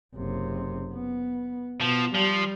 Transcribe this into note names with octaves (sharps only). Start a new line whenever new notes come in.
F#1 C3
B3
B2 F3
F3 G3